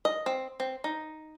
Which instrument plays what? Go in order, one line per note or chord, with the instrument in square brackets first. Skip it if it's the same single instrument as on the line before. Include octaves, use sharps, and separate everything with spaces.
[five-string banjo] D#5
C4
C4
D#4